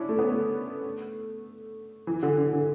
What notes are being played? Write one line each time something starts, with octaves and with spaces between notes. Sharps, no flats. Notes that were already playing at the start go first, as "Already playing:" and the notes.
Already playing: C#4 D4 E4
A3
B3
A3
E3
D3
D3
D3